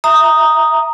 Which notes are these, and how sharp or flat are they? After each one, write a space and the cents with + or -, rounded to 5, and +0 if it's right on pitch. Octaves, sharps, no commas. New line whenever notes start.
E5 +0 A#5 +0 D#6 +0